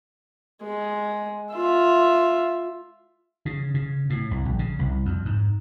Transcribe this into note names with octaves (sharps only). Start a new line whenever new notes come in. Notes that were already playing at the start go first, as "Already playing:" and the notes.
G#3
F4 E5
C#3
C#3
A2
C2
A#1
C#3
C2
F2
G#2